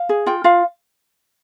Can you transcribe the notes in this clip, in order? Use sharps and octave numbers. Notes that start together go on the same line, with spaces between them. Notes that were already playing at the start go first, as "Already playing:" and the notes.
Already playing: F5
G#4
F4 G5
F4 F5